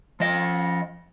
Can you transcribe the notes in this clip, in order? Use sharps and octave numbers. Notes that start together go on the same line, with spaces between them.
F3 D#5